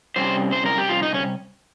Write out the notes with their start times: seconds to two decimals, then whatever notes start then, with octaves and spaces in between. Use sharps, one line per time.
0.16 C3 G3 C#4 C5
0.52 C5
0.66 A#4
0.78 G4
0.89 F4
1.03 D#4
1.14 C#4